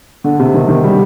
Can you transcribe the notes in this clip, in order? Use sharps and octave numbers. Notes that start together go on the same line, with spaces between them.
D3
C3
D#3
D#3
G3